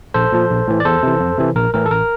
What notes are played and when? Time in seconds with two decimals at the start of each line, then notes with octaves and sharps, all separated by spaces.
0.14 A#1 A4 C5
0.32 A#2 F3
0.50 A#1
0.68 A2 E3
0.80 D5
0.85 E2 A4 C5
1.03 C3 E3
1.20 F2
1.38 C3 E3
1.56 A#1 A#4
1.74 A2 E3 A#4
1.86 A4
1.91 A1 A#4